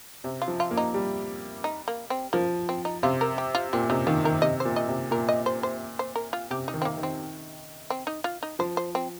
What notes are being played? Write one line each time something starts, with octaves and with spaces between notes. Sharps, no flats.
C3
F4
F3
F4
A#3
D#4
G3
D#4
A#3
C4
F3 A#3
C4
D#4
C3 F4
A#4
G4
F4
A#2 C4
C3 D#4
D#3 F4
D#3 A#4
C3 D#5
C5
A#2
D#5
C3
A#2 A#4
D#5
C5
C5
C5
A#4
F4
C3 G4
D#4
D#3
C4
A#3
D#3
C4
C4
D#4
F4
D#4
F3 C5
C5
C4